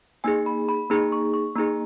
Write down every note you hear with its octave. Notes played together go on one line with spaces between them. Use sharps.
A#3 D#4 G#4 G#5
B5
B5
A#3 D#4 G#4 A#5
C#6
C#6
A#3 D#4 G#4 A#5